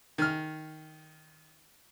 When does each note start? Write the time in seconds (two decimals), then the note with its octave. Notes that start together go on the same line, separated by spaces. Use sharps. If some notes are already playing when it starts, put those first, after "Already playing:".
0.18 D#3 F6